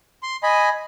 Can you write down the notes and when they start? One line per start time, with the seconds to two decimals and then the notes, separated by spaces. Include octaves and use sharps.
0.23 C6
0.43 D#5 G#5 B5